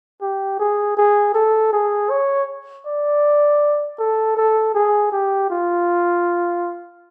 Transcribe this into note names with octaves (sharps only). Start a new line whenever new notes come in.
G4
G#4
G#4
A4
G#4
C#5
D5
A4
A4
G#4
G4
F4